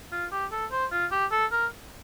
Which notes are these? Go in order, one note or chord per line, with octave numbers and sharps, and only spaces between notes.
F4
G4
A4
C5
F4
G4
A4
A#4